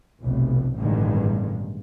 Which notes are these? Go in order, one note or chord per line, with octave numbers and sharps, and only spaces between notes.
F1 B1
A1 G2 B2 D3 D#3 G#3